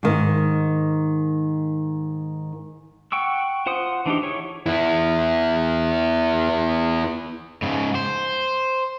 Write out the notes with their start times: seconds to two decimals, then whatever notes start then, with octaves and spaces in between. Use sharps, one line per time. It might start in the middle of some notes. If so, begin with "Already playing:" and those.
0.03 G#2 D#3
3.12 F#5 G5 C#6 E6
3.66 F4 C5 F#5 C6 D#6
4.06 E3 D4 D#4 G4
4.22 E4 G#4 C#5
4.66 B3 E4
7.62 G#2 C#3
7.95 C5